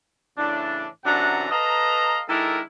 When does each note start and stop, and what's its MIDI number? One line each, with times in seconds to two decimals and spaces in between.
0.38 0.85 45
0.38 0.85 49
0.38 0.85 52
0.38 0.85 62
1.05 1.47 42
1.05 1.47 48
1.05 1.47 52
1.05 1.47 62
1.05 1.47 78
1.05 1.47 82
1.51 2.20 69
1.51 2.20 71
1.51 2.20 75
1.51 2.20 77
1.51 2.20 82
2.29 2.59 51
2.29 2.59 56
2.29 2.59 62
2.29 2.59 64
2.29 2.59 69
2.29 2.59 70